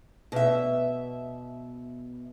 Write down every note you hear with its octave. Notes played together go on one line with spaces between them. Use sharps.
B2 E5